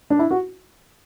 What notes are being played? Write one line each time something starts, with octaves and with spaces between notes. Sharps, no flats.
D4
E4
F#4